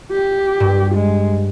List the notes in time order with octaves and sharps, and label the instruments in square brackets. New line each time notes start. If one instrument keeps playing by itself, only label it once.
[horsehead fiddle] G4
[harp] G2
[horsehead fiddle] G#3